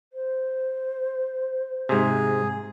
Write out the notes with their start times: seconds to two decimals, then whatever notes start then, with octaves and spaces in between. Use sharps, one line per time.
0.13 C5
1.89 G#2 C3 G#4